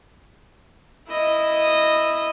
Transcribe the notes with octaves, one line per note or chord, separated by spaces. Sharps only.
E4 D#5